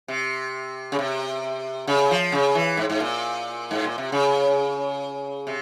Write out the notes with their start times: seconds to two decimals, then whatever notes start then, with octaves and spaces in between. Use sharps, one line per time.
0.08 C3
0.92 C#3
0.99 C3
1.87 C#3
2.11 F3
2.32 C#3
2.55 E3
2.77 G#2
2.90 G#2
3.00 A#2
3.71 G#2
3.85 A#2
3.98 C3
4.12 C#3
5.47 C3